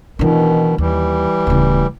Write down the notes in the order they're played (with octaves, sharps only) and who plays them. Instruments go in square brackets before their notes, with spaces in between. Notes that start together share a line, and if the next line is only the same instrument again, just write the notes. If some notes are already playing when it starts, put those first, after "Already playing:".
[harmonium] B2 D#3 [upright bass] E3 D4
[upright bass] D#2 [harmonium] E3 G3
[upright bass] D1 C#3